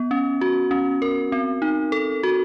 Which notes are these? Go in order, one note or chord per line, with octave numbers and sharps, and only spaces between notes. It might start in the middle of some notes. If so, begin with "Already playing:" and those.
Already playing: B3
C#4
F#4
C#4
A#4
C4
D#4
A4
F#4